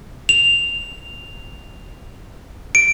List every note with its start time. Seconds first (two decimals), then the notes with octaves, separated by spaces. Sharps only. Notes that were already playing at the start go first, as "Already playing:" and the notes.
0.29 F7
2.75 D7